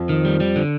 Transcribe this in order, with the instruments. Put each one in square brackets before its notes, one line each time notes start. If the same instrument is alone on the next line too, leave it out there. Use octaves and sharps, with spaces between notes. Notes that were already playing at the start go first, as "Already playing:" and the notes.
Already playing: [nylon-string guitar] F2 F3
[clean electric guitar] D#3
G3
G3
D3